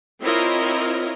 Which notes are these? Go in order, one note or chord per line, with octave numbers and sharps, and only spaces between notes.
C4 E4 F4 A#4 C#5 D#5